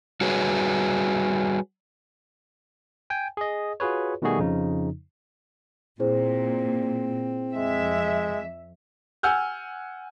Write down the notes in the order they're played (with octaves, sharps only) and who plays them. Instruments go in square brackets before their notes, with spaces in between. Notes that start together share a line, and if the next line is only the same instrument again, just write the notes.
[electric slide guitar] G3 F#4 G#4 B4 C#5
[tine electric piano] G5 G#5
G#4 D#5
F4 F#4 G#4 B4 C#5
B2 D#3 G3 A3 F#4 G#4
F2 C#3 F3 D#4
[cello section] A#2 [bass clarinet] C4 [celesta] E4 G#4 C5
[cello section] F2 E5 [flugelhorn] G#3
[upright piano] F#5 G#5 E6 F6 G6